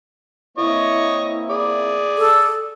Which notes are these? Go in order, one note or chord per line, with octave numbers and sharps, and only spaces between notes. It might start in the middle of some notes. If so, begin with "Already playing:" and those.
A#3 C4 E4 C#5 D#5 C#6
G#4 D5
A4